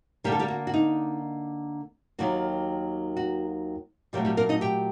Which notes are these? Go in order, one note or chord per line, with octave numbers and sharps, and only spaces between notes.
D3 G3 A#3 G4
A4
G3 G4
F#4
F#4
D#4
D#2 D#3 F#3 A#3 F#4
F#4
A#2 F#3 G3 A3 G4
G3 G4
A#3 A#4
D#4 D#5
G4 G5